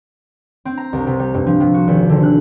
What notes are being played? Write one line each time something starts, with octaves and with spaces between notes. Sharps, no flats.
C4
A#5
C2
C3
G3
G2
F3
C3
F#4
G#1
D3
F#6